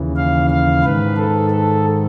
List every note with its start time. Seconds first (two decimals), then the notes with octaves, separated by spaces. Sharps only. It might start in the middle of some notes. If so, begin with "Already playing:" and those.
Already playing: D#2 C#3 E3
0.17 F5
0.50 F5
0.83 G#2 D#3 B4
1.17 A4
1.50 A4